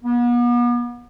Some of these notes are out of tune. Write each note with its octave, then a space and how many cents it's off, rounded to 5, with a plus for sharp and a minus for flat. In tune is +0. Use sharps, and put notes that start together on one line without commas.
B3 -40